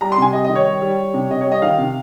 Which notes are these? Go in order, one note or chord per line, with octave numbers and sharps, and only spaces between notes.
G3 A#5
C6
C3 G#5
G3 D#5
D#3 D#5
C#5
G3
G3
G3
C3
C3 D#5
C#5
G3
D#5
D#3 F5
C3